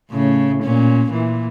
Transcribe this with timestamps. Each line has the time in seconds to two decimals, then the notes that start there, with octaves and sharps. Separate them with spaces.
0.10 A2 C#3
0.63 A#2 C#4
1.10 A#2 E3